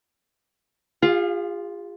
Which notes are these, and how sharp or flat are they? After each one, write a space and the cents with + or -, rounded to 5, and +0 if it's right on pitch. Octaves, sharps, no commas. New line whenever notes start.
F4 +0 G#4 -40 F5 +35